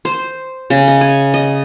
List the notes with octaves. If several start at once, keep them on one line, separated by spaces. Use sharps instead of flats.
C5
C#3
D#5
G#5
D#5